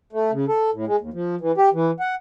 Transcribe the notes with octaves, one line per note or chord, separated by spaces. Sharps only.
A3
C#3
A4
A2
G#3
D#2
F3
E3
G4
E3
F#5